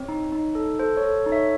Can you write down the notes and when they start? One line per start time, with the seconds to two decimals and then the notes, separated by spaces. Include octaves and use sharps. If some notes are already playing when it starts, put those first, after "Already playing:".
Already playing: C4 C#5
0.09 D#4
0.32 D#4
0.55 A4
0.79 A4 C5
0.97 C#5
1.03 A4
1.26 D#4
1.32 C#5 E5